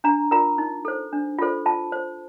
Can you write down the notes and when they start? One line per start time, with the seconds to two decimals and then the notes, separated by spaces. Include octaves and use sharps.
0.04 D4 A#5
0.31 F4 A#4 A#5
0.58 D#4
0.85 A4 C5
1.13 D4
1.39 F4 A4 C5
1.66 F4 A5
1.92 C5